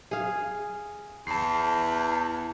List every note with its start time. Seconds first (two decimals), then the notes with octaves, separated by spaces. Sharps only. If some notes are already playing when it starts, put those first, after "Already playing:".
0.11 G#4 F5
1.27 E2 A5 C7